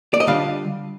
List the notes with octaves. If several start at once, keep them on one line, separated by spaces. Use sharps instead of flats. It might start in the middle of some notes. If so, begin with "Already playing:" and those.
D5
D#5
D3 G3 D4 F4 F5